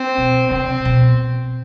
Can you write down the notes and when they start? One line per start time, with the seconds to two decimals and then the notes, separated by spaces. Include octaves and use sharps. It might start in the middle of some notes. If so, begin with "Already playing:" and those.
Already playing: C4
0.18 B2
0.51 C3 C4
0.85 B2